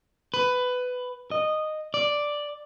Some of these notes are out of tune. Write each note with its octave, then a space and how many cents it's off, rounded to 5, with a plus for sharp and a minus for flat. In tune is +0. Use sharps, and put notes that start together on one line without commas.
B4 +15
D#5 -10
D5 +0